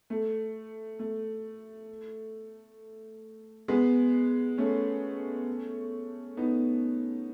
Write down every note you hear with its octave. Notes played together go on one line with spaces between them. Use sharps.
A3
A3
G#3 B3
A3 C#4
B3 D#4